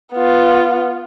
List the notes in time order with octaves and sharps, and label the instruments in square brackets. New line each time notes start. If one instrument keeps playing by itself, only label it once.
[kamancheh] B3 F4